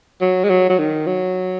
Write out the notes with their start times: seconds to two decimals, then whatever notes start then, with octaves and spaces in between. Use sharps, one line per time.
0.21 F#3
0.44 G#3
0.50 F#3
0.70 F#3
0.79 D#3
1.07 F#3